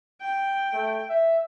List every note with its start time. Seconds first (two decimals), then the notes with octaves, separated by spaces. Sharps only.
0.21 G5
0.73 A3
1.10 E5